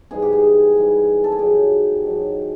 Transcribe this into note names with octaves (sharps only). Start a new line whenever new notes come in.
G#2 E3 G3 G#4
G4
G#4
G#2 E3 G3
A4
G#4
G#2 D#3 F#3 G4
G#2 D#3 F#3